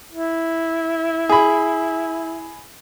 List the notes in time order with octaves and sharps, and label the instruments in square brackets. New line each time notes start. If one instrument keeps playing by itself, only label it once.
[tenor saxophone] E4
[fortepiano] G#4 B5